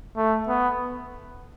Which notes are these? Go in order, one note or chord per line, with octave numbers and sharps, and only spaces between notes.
A3
B3